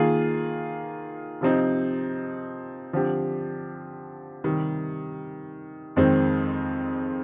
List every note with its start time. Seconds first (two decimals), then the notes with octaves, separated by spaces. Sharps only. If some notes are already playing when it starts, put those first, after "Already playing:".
Already playing: D#3 A#3 F4 G#4
1.41 C3 F3 C4 D#4
2.93 D3 F3 C4 G4
4.44 C3 D#3 G3
5.96 F2 D#3 G#3 C4